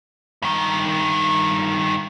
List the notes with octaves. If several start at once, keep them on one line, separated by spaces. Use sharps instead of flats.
G2 D#3